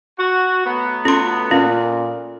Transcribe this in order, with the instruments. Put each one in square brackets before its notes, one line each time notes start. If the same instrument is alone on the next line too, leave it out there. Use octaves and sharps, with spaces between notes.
[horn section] F#4
F#3 A3 B3
[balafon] C#4 C6 [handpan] F4 A4
[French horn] A#2 [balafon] C#4 [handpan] F4 F5